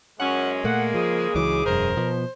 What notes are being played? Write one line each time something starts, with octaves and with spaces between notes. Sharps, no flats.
F#2 G#3 C#4 F#5
A#2 A3 A#3 F#5
C#3 F3 D#4 G#4
C#2 E3 F#3 D6
E1 F#2 A#4 C5
B2 F3 B3